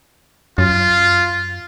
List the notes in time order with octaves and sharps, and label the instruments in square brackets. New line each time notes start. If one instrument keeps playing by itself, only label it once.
[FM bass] F#2 [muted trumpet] F4